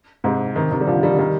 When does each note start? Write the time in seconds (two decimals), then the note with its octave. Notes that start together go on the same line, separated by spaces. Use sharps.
0.24 G#2 C3
0.55 C3 D#3
0.71 C3 D#3
0.81 G3
0.87 D3 F3
1.03 D#3 G3
1.19 D#3 G3